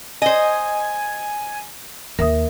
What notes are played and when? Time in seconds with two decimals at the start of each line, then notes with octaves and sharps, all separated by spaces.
0.22 C5 D#5 G#5
2.19 D#2 A#4 E5 D#6